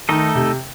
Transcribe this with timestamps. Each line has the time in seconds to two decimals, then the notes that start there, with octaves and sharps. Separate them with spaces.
0.09 D#3 A3 D#4 A4 D#5
0.35 C3